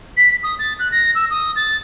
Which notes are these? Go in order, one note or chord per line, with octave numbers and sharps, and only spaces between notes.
B6
D#6
A6
F#6
A#6
E6
D#6
A6